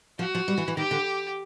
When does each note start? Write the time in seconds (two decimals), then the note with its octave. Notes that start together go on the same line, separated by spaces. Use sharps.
0.19 F3 F#4
0.35 F3
0.48 G3
0.58 E3
0.68 E3
0.77 D#3 G4
0.91 D3